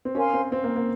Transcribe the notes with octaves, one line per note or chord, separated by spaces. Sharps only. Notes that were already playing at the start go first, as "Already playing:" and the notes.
C4
C#4 A#4 F5 G#5 C6
C4
C4
A#3
A#3